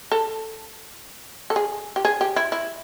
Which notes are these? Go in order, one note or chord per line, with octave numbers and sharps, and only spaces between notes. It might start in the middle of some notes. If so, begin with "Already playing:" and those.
A4
A4
G#4
G4
G#4
G4
E4
E4